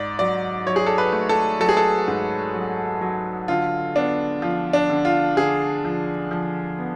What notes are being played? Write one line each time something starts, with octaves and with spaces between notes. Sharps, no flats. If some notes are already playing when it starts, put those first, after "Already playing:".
Already playing: G#2 D5
F#3 D5
F#3 C#5
G#4
A4
B4
A3
A4
F#3 A4
G#4
A4
G#2
F#3
F#3
D3 F4
B3 D4
F3 F4
D4
D3
F4
D3 G#4
F3
F3
B3